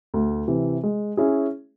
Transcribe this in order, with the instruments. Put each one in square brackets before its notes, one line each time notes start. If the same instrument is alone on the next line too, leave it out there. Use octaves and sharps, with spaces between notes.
[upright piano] D2
C3 E3
G#3
C#4 E4 G#4